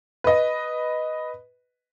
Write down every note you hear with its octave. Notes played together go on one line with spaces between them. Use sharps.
B4 D#5